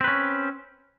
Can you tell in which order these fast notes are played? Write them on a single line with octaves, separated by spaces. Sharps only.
C4 B4 C#4